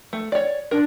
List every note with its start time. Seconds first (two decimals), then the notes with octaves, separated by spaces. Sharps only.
0.13 A3
0.32 C#5 D5
0.71 D4 A#4